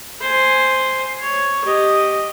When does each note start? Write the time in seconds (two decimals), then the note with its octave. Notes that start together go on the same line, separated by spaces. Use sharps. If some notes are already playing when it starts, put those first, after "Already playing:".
0.21 C5 G#5
1.22 C#5
1.65 G4 D#5